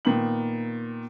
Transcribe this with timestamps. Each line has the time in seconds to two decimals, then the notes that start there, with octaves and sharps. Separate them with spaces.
0.05 A#2 D#3 B3 F#7